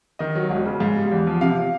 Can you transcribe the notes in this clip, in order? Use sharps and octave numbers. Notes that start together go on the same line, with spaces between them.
D#3 D#5
F#3
E1
C#3
G#2 F5
G3
E2
F3
C3 F5